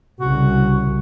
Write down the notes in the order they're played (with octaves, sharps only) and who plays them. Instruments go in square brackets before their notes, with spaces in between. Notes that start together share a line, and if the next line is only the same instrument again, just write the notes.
[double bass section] C2 C#3 [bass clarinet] F#4